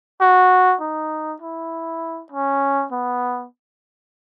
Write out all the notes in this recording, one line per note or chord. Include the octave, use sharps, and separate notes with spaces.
F#4
D#4
E4
C#4
B3